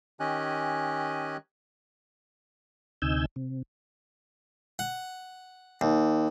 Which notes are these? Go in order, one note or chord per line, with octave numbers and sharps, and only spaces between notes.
D#3 C#4 G4 D#5 G#5 F#6
D2 C3 D#4 G#5 E6 G6
C3
F#5
D#2